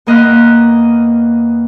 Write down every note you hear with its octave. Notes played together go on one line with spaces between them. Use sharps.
E2 A#3 D#5 F6 F#6